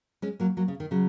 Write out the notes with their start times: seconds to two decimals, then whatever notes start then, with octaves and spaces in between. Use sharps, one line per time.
0.22 G#3 C#4
0.40 F#3 A#3
0.57 F#3 A#3
0.68 C#3
0.80 D#3
0.91 C#3 F#3